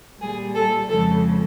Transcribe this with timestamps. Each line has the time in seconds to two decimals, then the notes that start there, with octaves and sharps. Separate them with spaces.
0.20 A#2 G3 G#4
0.54 A4
0.88 F2 C#3 F3 G#3 A4